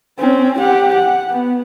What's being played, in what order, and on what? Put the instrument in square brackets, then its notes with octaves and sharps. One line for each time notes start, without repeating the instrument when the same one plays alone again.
[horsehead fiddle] C4 C#4
G4 F#5
F#5
B3